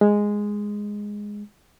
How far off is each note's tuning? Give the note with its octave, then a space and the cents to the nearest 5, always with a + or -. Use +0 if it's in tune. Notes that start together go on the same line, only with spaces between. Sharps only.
G#3 -5